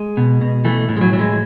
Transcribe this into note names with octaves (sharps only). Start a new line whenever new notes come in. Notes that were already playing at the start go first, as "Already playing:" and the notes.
Already playing: G#3
B2
B2
E3 A3
A2
G#3
F#3
E3 F#3
G#3